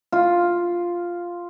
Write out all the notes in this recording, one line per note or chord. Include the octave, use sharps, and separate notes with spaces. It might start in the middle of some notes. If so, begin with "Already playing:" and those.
F4